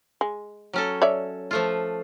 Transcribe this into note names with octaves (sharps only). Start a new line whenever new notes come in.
G#3
F#3 C#4 A4
C#5 D5 E5
F3 A3 F4